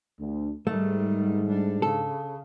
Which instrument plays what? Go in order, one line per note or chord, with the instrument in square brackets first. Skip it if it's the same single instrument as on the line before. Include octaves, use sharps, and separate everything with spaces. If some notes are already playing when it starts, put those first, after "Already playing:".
[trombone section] D2
[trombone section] G#2 [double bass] D#3 G3 [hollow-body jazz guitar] A3
[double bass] G3 D4
[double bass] C#3 [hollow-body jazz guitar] A4